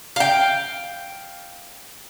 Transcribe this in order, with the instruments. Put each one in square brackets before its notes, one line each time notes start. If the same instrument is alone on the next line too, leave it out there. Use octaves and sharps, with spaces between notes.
[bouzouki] F5 G5